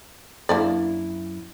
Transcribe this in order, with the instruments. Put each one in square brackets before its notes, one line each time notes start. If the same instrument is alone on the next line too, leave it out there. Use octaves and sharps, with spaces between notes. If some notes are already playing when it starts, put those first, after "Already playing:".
[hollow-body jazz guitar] F#2 E4 [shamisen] A#3 D4 D5